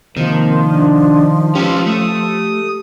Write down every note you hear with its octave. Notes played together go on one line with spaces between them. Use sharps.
C3 D#3 F3 A#3 C4
D4
C#4 F4 G4 B4
A3 D#6